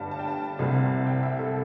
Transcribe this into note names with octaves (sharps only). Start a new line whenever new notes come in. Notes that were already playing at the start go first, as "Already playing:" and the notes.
Already playing: G1 G2 D3 G3 A5
A5
G5
A5
C2 C3 G3
G5
E5
A4